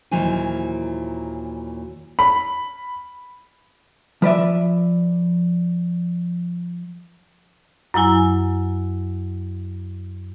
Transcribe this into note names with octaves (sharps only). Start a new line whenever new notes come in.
D#2 A#2 E3 F#3 C5 G#5
B5
F3 B4 D5 E5
F#2 F#3 E4 G#5